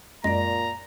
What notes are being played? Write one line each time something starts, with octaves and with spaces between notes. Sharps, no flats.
F#2 A#2 G#3 D5 A#5 A#6